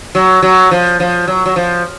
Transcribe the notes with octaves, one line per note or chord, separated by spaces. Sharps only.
F#3
F#3
F3
F3
F#3
F#3
F3